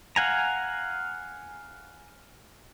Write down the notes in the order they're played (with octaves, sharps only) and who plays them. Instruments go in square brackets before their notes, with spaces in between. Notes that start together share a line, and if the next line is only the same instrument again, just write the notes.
[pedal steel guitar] F5 F#5 G#5 A#5